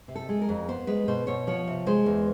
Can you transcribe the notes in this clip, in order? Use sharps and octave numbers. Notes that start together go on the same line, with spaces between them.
C3
A4
G#3
A#4
F2
B3 C5
G#3 B4
B2 C5
B2 C#5
F3 C#5
C3
G#3 C5
E2